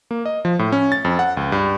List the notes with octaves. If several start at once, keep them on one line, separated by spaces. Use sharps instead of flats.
A#3
D#5
F3
A2
C#4
A6
F2
F#5
C#2
G2